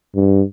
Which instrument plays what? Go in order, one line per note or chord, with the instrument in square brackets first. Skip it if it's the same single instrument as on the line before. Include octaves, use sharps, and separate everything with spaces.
[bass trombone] G2